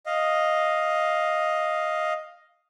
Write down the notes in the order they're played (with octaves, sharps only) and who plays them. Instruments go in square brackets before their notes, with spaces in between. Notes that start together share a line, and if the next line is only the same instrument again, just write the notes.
[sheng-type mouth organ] D#5 F5